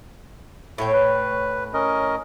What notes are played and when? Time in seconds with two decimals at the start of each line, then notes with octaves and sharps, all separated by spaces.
0.78 A2 A3 E4 C#5 G5
0.93 B4
1.74 C#4 A#4 D#5